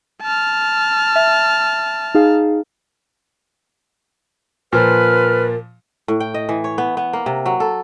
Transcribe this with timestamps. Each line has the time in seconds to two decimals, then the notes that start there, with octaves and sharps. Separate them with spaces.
0.22 A5 F6
1.16 E5
2.15 D#4 G#4 F5
4.73 A#2 F3 A#4 B4 F6
6.08 A2
6.20 G5
6.34 D#5
6.49 E3
6.64 C#5
6.78 B3
6.97 B3
7.13 A#3
7.26 C3
7.46 F#3
7.60 A4